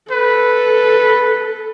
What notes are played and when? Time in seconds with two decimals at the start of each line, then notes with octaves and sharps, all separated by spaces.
0.11 A4 B4